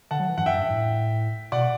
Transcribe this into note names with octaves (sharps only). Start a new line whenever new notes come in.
D3 F#5 A5
F#3
E3
G2 F#5
F#2 E5 G5
G2
A2
B2 D5 F#5